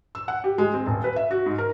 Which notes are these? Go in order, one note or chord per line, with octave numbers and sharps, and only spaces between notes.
E6
F#5
G4
G#3
C4
D#1
B4
E5
F#4
G#2
A#4